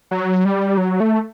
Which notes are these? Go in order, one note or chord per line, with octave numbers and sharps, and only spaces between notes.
F#3
G3
F#3
A3